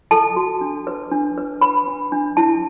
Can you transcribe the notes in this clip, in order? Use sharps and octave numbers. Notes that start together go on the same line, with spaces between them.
A4 A5
F#4
D4
B4
D4
B4
B4 B5
D4
D4
E4 A5